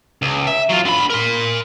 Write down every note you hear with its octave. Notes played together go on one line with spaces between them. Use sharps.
C#2
E5
F#3 F4
D3 B5
A#4 C6